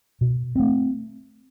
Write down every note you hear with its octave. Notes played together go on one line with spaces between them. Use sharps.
B2
A3 C4